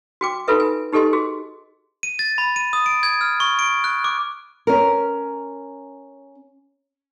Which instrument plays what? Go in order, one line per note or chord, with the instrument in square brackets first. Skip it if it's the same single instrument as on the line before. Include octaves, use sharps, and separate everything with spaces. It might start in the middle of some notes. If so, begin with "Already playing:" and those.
[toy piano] F#4 G5 D6
D#4 F4 F#4 A4 B4 E5
G#5
D#4 G4 A4 D#5 G#5 C6
F#4 G#4
[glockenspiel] D#7
A6
B5
D#7
D#6
D7
G#6
F6
C#6
D7
F#6
D6
[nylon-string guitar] C#4 A#4